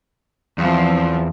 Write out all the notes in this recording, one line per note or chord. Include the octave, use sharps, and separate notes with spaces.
E2 F3 C4